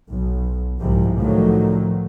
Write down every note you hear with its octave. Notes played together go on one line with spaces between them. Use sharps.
B1
C2 G#2 C3 F3
A2 D3 D#3 F3 F#3 A3